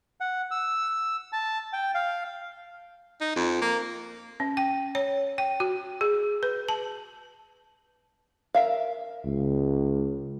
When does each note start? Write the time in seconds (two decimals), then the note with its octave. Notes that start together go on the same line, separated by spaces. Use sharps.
0.20 F#5
0.51 E6
1.33 A5
1.73 G5
1.95 F5
3.21 D#4
3.36 F2
3.62 A#3
4.40 C#4
4.57 G5
4.95 C#5
5.38 G5
5.60 F#4
6.01 G#4
6.43 B4
6.69 A5
8.54 A#4 E5 F5
9.25 C#2